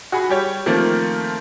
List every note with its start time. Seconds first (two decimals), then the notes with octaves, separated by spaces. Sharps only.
0.12 F#4 G#4 F#5 B5
0.29 G3 G4 C#5
0.66 D#3 F3 A3 A#3 C4